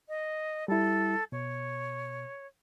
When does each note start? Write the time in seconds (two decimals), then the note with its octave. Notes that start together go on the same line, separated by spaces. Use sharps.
0.09 D#5
0.68 G3 E4 A4
1.32 B2 C#5